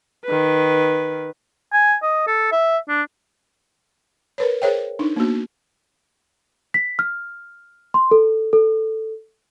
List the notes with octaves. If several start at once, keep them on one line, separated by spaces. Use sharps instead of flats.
D#3 B4
G#5
D#5
A4
E5
D4
A#4 B4 C#5
G#4 A#4 C5 C#5 E5 G5
D4 D#4
A#3 B3 D4 F#4
B6
F6
C6
A4
A4